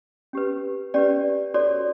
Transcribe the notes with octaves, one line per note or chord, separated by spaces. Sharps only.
C#4 G4 B4
C#4 G4 B4 D5
F#4 A4 C#5 D5